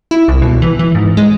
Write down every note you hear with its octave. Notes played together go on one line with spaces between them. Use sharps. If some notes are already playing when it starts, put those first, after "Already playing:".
E4
C2
B2
E3
E3
G#2
G#3